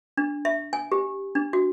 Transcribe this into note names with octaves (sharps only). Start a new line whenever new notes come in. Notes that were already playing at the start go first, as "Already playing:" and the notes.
D4
E5
G#5
G4
D4
F#4